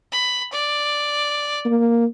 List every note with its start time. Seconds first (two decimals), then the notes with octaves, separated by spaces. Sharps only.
0.12 B5
0.52 D5
1.65 A#3